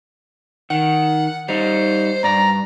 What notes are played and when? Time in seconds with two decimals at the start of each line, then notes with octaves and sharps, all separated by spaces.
0.70 D#3 F#5
1.49 G3 D#4 C5
2.24 G2 D5 A#5